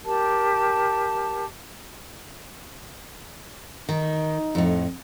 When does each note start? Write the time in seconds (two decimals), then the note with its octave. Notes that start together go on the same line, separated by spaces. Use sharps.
0.04 G4 A#4 A5
3.89 D#3 D#4
4.55 F2 A2